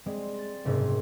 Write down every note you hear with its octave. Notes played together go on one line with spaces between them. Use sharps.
G3 G#3 C4
A6
F#1 G#2 C3 A#3 G#4 C5